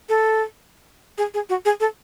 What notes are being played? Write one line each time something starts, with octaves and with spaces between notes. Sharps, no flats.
A4
G#4
G#4
F#4
G#4
A4